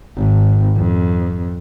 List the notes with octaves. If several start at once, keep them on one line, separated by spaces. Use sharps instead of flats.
G#1
F2